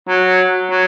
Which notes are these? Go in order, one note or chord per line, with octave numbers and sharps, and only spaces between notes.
F#3
F#3